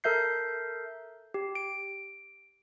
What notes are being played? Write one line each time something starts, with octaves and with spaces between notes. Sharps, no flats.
A4 A#4 E5 G6 C7
G4
D7